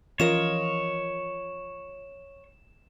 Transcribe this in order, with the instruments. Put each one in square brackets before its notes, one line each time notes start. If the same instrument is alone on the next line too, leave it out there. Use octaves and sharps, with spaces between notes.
[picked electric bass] E3 F3 C#4 [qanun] F4 A#4 D#5 [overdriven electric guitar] C#5 [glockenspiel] E7